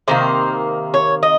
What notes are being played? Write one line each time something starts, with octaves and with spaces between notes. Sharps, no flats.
C3 D#3 A#3 C5
C#5
D#5